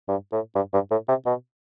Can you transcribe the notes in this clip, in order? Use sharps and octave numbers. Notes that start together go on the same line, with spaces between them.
G2
A2
G2
G2
A2
C3
B2